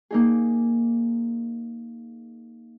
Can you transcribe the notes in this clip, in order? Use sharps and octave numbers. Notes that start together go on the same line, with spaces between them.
A#3 D#4 G#4